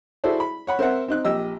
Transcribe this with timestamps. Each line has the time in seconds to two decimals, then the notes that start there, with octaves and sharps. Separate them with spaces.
0.24 E4 F#4 G#4 A4 C5 D5
0.40 B5
0.67 C#5 F#5 B5
0.79 C4 A#4 C5 E5 F#5
1.08 C4 D#4 F#6
1.25 A#1 G4 D#5 E6